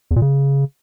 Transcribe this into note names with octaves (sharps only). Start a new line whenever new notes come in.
E2
A#2
C#3